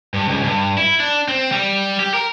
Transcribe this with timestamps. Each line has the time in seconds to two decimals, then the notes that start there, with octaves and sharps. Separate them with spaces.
0.14 G2
0.28 C#2
0.44 G2
0.78 E4
1.00 D4
1.28 C4
1.52 G3
2.00 G4
2.14 A#4